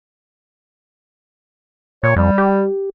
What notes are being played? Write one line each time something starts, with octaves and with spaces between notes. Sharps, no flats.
A#2 C#5
F2 G3
G4